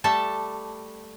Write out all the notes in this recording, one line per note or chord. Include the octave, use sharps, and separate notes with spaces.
G3 A3 A4 A5